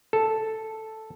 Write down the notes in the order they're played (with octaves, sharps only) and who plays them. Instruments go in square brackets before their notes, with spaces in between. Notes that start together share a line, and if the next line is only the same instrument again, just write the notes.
[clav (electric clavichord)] A4